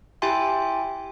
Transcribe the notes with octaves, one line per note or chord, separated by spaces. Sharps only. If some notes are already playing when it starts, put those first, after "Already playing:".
E4 G4 E5 G5 G#5 C6